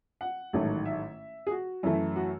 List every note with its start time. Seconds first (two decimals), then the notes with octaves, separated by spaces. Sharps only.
0.21 F#5
0.53 A1 G#2 D#3 F#3 A3
0.85 E5
1.47 G#4
1.51 F#4
1.83 F#2 E3 A3 E4
2.16 F#4